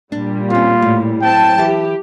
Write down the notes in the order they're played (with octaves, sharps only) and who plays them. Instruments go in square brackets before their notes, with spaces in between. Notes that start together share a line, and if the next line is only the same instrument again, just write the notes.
[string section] A#2 G3 [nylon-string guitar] D4
[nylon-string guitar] C4 C#4 [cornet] F4
[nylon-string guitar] A2
[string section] F#3 C4 A5 [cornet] G5
[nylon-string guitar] E3 A5 [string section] G4